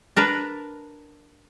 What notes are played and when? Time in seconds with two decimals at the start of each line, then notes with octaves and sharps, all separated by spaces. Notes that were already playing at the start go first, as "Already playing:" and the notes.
0.16 D4 A#4 B4 A#5